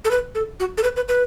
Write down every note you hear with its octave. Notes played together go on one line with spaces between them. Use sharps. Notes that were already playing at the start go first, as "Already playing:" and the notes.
A4
B4
A4
F#4
A4
B4
B4
B4